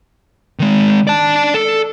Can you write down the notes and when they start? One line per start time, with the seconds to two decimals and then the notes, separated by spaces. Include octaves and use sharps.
0.59 D#3 G#3
1.07 D5 A5
1.54 A4